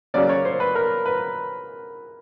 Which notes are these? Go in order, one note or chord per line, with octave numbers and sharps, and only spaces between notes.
C#3 F#3 A#3 C#4 D5
C#5
C5
B4
A#4
B4